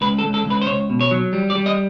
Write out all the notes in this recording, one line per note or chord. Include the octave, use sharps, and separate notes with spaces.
C#2 B4
A4
C#2
A4
C#2
B4
C5
C#2 C#5
B2
C#5
F#3
G3
D5
G3
D#5